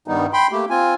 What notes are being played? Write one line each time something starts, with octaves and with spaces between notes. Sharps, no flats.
G2 D#3 G3 B3 D#4
G5 B5 C6
A3 A#3 G4
C4 F4 G#5